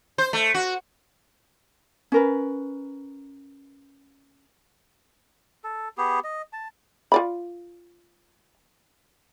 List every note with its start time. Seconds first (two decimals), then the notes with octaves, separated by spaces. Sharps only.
0.18 C5
0.33 A3
0.54 F#4
2.12 C#4 A#4 B4
5.64 A4
5.98 B3 G4 G#4
6.24 D#5
6.53 A5
7.12 F4 D5 B5